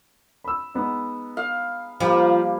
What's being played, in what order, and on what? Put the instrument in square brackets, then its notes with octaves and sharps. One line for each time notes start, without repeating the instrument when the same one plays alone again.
[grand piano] B5 E6
G#3 B3 D#4
[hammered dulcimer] F5
[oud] F3 [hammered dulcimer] G3 A#3